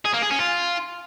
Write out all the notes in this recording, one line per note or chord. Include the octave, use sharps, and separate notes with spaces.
G#4
A#3
G#4
C#4
F4